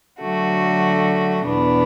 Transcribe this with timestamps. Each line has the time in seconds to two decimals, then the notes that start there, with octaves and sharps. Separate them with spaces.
0.20 D3 F#3 A3 F#4
1.45 E2 B2 B3 D4